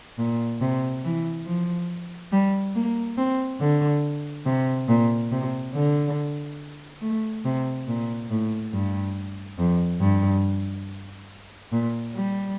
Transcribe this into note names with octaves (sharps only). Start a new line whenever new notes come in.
A#2
C3
E3
F3
G3
A#3
C4
D3
C3
A#2
C3
D3
A3
C3
A#2
A2
G2
F2
G2
A#2
G3